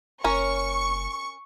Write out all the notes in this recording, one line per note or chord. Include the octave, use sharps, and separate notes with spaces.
F#1 C#4 A#4 C#6